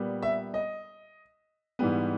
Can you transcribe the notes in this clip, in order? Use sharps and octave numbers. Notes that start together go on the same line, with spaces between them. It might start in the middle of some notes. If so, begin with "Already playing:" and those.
Already playing: A#2 G3 B3
E5
D#5
G#2 E3 G3 B3